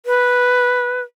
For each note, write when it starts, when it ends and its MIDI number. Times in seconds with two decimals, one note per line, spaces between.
0.06 1.01 71